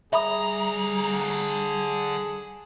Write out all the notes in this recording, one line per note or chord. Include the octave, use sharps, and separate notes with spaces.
D3 G3 G#4 E5 A#5 B5 D#6